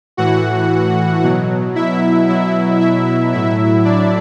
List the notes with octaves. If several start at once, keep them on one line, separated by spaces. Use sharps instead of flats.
A2 E3 F#4 F#5
B2 F#3
E4 E5
B2 F#3 E4 E5
E4 E5
A2 F#3 E4 E5
D4 D5